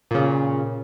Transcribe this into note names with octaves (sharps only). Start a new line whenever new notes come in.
A#2 C#3